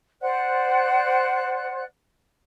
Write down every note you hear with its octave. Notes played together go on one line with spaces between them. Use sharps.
C5 D5 F#5 F#6